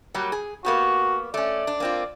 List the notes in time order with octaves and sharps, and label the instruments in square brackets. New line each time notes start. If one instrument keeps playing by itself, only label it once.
[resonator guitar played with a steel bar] F#3 G3 A#3
G#4
[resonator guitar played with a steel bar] A#3 B3 G4 [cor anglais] F#4
[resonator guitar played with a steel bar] A3 C#4 [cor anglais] D5
[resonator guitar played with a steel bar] D4
A#3 C4 F4